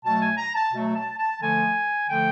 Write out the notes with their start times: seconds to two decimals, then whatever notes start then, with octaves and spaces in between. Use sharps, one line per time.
0.03 B2 F#3 A3 A5
0.20 G#5
0.37 A#5
0.54 A5
0.72 B2 F#3 A3
0.94 A5
1.17 A5
1.40 D3 F3 A3 G#5
2.08 D3 F3 A3 G5